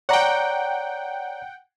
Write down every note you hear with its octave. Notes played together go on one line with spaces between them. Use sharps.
C#5 D5 F#5 G5 A#5